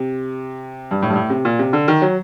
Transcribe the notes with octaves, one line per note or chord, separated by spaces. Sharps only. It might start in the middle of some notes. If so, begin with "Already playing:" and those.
Already playing: C3
G2
A2
G2
A2
C3
A#2
C3
D3
D#3
F#3